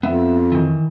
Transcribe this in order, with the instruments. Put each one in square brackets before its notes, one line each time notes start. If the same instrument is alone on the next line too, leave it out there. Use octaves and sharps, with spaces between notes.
[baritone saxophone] F2 [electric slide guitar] B3 E5
[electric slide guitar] D#3 E3